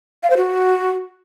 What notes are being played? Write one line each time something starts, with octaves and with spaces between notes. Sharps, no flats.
F5
C5
F#4